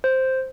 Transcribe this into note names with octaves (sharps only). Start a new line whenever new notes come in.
C5